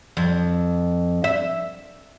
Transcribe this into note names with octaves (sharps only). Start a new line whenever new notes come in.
F2
E5